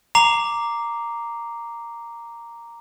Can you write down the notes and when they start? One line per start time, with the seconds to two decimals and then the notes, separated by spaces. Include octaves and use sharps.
0.15 A#5 D6 C7 F7